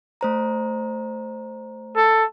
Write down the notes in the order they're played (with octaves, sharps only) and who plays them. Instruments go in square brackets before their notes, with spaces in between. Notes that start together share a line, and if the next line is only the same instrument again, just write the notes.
[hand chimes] A3 C5 A#5
[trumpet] A4